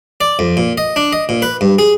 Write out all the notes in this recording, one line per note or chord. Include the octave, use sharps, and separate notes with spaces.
D5
F2
A#2
D#5
D4
D#5
A#2
B4
G2
G#4